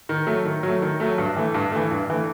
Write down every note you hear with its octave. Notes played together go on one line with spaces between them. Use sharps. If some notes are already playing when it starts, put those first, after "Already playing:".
D#3
F#3 A3
D#3
F#3 A3
D#3
F#3 A3
G2
E3 A3
G2
E3 A3
G2
E3 A3